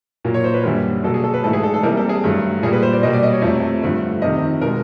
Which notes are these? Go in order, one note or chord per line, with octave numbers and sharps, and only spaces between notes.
A#2 F#3 A#3
C#5
C5
B4
F#2 D3 G3 A#3
B2 F#3 A#3 A4
G#4
A4
B4
G#2 E3 A3 A4
G#4
A4
A4
C3 E3 G3 A#3 A#4
A4
G#4
G2 D3 F#3 A3
A#2 G3 A#3 G#4
B4
C5
D5
B2 G3 A#3 D#5
D5
D#5
C#5
F2 C3 F3 A3
G2 D3 F3 A3
F2 C3 D#3 D#5
B2 G#3 A#4